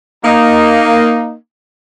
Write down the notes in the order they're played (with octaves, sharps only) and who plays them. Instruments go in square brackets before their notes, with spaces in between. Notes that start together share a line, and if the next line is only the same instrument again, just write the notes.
[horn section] A#3 D#4